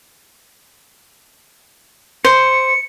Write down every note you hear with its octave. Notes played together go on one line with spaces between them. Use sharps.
C5 C#7